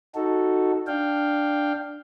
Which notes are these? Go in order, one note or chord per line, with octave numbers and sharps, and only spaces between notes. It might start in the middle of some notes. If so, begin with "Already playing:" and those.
D#4 F#4 A4
D4 F5 G5